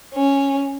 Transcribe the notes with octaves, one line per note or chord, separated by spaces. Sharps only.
C#4